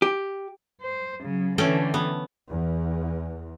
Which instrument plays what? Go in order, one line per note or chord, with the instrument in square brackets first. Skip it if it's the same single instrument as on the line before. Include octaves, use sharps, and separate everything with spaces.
[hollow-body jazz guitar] G4
[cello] C5
C#3 F#3
[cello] D3 E3 [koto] A3 C#4 G5
[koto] B3
[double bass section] E2